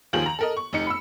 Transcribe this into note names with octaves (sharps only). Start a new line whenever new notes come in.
D#2 D#3 F3 G#4 F#7
A#5
A4 A#4 D#5
C#6
F1 D#4 C#7
B5 E6